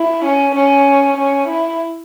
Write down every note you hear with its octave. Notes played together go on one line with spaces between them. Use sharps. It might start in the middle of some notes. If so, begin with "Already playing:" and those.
Already playing: E4
C#4
C#4
C#4
E4